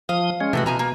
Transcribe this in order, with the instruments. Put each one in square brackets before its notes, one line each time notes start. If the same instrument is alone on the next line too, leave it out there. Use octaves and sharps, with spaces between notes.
[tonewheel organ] F3 D#6 [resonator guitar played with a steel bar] F5
[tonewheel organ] G#3 C#4
[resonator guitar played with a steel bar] A2 A#3 F#4 [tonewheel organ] C3 E3 A3
[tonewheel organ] B2 [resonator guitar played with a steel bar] F3 G#5 A#5
[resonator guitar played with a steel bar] A#3